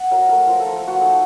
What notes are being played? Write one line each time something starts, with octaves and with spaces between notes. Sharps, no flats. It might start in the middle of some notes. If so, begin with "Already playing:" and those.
Already playing: F#5
F#3 A#4
A3 A#4
F3 A#4
A4
F3
A#4
A3 F#4
D#4 A4